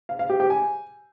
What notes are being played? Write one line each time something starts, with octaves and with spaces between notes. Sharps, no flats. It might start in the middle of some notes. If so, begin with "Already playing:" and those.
F5
F5
G4
G4
G#5